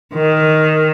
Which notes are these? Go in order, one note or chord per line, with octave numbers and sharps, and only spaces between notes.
D#3